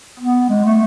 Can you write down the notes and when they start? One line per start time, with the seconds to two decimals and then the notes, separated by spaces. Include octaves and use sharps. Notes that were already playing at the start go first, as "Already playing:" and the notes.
0.19 B3
0.49 G#3
0.65 A3